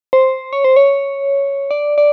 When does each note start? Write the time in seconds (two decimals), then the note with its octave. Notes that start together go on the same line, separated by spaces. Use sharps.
0.13 C5
0.53 C#5
0.64 C5
0.76 C#5
1.71 D5
1.98 D5